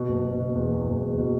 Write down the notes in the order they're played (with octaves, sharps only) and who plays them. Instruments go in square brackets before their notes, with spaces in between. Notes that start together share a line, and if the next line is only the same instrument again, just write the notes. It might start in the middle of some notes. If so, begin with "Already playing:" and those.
Already playing: [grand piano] B2
F#1
B2
B2
E2
E2
F#1
E2
B2